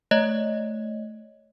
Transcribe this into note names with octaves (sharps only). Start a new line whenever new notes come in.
A3 C#5 D#5